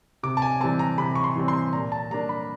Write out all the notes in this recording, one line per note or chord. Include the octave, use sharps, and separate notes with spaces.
C3 D6
A5
G#5
E3 G3 C4 A5
A#5
C3 B5
C#6
C6
E3 G3 C4
C6
A#2 A#5
A5
G3 A#3 D4 A#5
B5